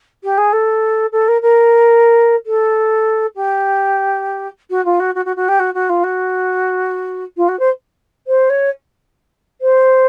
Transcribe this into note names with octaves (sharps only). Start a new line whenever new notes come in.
G4
G#4
A4
A4
A#4
A#4
A4
G4
F#4
F4
F#4
F#4
F#4
F#4
G4
F#4
F#4
F4
F#4
F4
F#4
C5
C5
C#5
C5